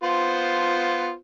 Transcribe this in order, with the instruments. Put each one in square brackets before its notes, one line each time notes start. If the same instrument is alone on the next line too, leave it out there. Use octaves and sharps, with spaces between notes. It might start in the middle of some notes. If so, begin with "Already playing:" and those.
[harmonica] B3 F4 C5